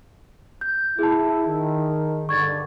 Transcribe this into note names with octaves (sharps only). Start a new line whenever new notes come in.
G6
E4 G#4 A5
D#3
G2 D3 C#6 G#6 A6